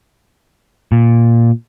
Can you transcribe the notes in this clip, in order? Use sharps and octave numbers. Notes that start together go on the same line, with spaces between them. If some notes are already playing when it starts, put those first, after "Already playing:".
A#2